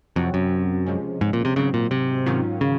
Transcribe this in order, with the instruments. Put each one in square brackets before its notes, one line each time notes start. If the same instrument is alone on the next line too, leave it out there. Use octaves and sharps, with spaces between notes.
[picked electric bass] F2 [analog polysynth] C3 F#3 C4 F#4
[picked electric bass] F#2
[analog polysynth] C#2 C3 F3 G#3 C#4
[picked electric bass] G#2
A#2
C3
[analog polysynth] G#1 G#2 F#3 C4 [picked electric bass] C#3
[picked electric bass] A#2
C3
[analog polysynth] G#2 D#3 F#3 C#4 F4
[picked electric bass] C#3